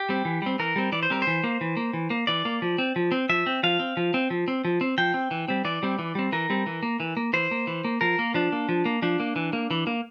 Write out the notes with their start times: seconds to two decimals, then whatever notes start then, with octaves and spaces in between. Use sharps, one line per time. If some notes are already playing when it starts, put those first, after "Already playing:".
Already playing: G4
0.09 G3 C4
0.25 E3
0.42 G3 C4
0.59 E3 A#4
0.76 G3 C4
0.92 E3 D5
1.03 C5
1.10 G3 C4 A#4
1.22 C5
1.27 E3
1.44 A#3
1.61 E3
1.77 A#3
1.94 E3
2.10 A#3
2.27 E3 D5
2.45 A#3
2.62 F3
2.78 C4
2.96 F3
3.12 C4
3.29 F3 E5
3.46 C4
3.63 F3 F5
3.79 C4
3.97 F3
4.14 C4
4.30 F3
4.48 C4
4.65 F3
4.81 C4
4.98 F3 G5
5.14 C4
5.31 E3
5.48 G3 C4
5.65 E3 D5
5.83 G3 C4
5.99 E3
6.15 G3 C4
6.32 E3 A#4
6.50 G3 C4
6.66 E3
6.83 A#3
7.00 E3
7.17 A#3
7.33 E3 C5
7.51 A#3
7.67 E3
7.85 A#3
8.01 F3 A#4
8.19 A#3
8.34 F3 D4
8.52 A#3
8.69 F3
8.86 A#3
9.02 F3 D4
9.20 A#3
9.36 E3
9.53 A#3
9.71 E3
9.87 A#3